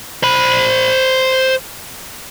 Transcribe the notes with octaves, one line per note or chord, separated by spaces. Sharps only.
C5 B5